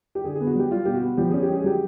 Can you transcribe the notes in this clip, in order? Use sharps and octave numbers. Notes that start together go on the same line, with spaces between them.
G4
D3 G#4
B3 G#4
F#4
F#3 G4
G3 F4
B2 G4
F#4
B3
F3 G4
C#4 G#4
G4
G#3
G#4
F#3 G4